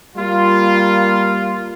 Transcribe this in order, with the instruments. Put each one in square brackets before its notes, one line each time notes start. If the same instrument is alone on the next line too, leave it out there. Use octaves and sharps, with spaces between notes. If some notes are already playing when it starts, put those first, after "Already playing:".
[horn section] G3 A#3 F4